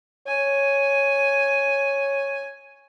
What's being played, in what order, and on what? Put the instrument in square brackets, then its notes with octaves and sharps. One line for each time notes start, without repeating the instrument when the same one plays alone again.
[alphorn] C#5 [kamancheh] G#5